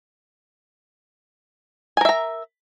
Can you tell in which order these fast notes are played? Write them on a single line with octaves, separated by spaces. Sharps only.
G#5 A#4 E5 A#5